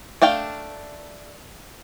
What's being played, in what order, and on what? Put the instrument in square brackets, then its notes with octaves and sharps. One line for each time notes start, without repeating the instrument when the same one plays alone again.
[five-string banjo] A3 D4 F5 G5